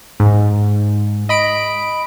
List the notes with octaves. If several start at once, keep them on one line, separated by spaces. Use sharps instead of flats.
G#2
D#5 B5 D7